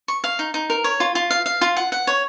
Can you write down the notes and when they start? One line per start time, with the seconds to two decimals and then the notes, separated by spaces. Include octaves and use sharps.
0.08 C#6
0.24 F5
0.39 D#4
0.54 D#4
0.70 A#4
0.84 C#5
1.00 F4
1.15 F4
1.31 F5
1.46 F5
1.61 F4
1.77 F#5
1.92 F#5
2.07 C#5